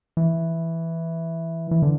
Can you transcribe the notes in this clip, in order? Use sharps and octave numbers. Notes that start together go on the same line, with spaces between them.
E3
E3
D3